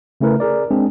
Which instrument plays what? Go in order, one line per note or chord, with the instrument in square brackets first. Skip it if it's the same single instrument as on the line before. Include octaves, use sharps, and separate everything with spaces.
[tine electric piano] C#3 A3 C#4 E4 A#4 B4
G#4 A#4 D5
G#3 C4 D4 G#4